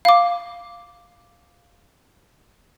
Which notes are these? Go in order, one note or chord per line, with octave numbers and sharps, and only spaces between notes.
F5 D6